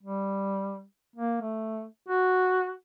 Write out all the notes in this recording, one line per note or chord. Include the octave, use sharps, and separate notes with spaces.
G3
A#3
A3
F#4